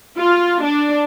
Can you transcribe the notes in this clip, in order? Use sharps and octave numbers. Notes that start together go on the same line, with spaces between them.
F4
D4